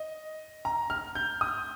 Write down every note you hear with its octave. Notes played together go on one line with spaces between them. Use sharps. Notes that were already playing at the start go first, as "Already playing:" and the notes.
Already playing: D#5
A#5
F6
G6
D#6